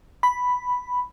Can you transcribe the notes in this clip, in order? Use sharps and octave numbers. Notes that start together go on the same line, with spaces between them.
B5